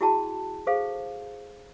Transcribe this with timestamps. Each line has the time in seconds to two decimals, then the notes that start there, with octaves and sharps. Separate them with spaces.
0.01 E4 F#4 G#4 G5 A5
0.67 G#4 A4 C5 F5